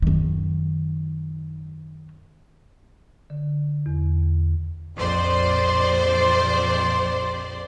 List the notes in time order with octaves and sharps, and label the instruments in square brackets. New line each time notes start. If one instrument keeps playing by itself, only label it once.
[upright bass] F#2 D#3
[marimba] D3
E2
[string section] A#1 F2 C5 D5 C6